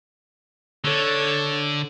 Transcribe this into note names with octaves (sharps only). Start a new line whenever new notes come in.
D3 A4 C#5